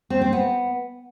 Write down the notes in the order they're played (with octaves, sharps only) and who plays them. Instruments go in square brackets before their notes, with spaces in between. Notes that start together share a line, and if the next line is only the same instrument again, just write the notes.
[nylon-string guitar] C4
C4
B3